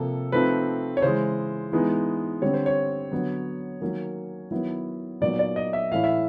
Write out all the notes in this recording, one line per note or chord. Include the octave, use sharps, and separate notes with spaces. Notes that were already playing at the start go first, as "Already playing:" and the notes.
Already playing: C3 F3 A#3 A4
F3 A3 C4 D#4 B4
C#5
C#3 E3 G#3 C5
E3 G#3 B3 D#4
D3 G3 C4 C#5
C5
C#5
D3 F#3 B3
D#3 F#3 A#3 C#4
D#3 F#3 B3 E4
A#2 F#3 B3 D#4 D5
D5
D#5
E5
A2 E3 A3 C#4 E4 F5
E5